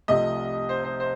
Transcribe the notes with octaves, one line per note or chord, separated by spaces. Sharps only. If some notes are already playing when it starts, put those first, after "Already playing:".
C2 C3 F3 A3 D#5
C5
C5
C5